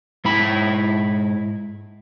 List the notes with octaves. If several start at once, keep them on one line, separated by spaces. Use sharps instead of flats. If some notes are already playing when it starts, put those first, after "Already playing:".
G#2 E4 B5